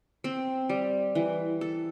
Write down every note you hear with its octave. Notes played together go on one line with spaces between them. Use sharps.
C4
G3
E3
A4